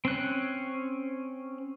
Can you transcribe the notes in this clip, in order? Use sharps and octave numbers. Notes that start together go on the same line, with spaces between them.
C4 C#4 F#6